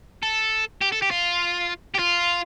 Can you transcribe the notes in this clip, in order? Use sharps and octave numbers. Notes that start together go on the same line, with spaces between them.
A4
G4
A4
G4
F4
G4
F4